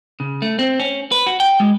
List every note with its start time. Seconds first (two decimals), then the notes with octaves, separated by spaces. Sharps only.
0.20 C#3
0.42 A3
0.59 C4
0.80 C#4
1.12 B4
1.26 F#4
1.40 G5
1.60 G#3